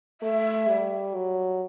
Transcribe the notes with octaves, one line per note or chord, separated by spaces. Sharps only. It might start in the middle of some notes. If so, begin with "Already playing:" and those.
A3 E5
G3
F#3